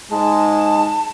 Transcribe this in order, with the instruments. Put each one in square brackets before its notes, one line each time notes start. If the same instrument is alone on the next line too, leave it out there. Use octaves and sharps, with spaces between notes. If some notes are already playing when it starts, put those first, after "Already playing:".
[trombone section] G#2 G#3 [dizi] A5